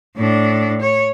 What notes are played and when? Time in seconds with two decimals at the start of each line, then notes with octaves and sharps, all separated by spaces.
0.17 A2 D4
0.81 C#5